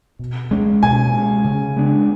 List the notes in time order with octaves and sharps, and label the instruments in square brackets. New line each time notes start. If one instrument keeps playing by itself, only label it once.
[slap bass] B2
G#3 C#4
[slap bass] B2 [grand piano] G#5
[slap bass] G#3 C#4
C#3
G#3 B3 D4